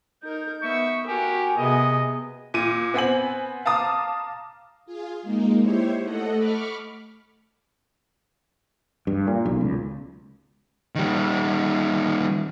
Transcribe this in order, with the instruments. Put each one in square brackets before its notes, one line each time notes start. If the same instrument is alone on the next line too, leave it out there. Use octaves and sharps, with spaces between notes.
[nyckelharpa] D#4 A#4 [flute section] G6
[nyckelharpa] B3 E5 [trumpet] C#6
[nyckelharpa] F#4 A#4 [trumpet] G4 [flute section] G#5
[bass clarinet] C3 [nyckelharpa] B3 G#4 [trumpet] D#5
[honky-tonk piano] A#2 D#7
B3 C4 G#5 F#7
F5 A5 A#5 D6 D#6
[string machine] F4 G#4
G#3 A#3 D#4
E4 G4 C5 C#5
A3 A4 D#5 F#5
B5 C#6 D6 F6
[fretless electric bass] G2
A#2
B1
C#2
[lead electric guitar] D#3 G3